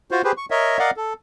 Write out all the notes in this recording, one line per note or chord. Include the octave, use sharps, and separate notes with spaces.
F4 F#4 C5
G4 G#4 B4 C5
C#6
A#4 C#5 D#5 E5
A#4 D5 D#5 F5 F#5
A4